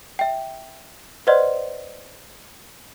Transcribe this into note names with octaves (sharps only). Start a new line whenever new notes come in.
E5 G5
B4 C5 D5 D#5 F#5 C6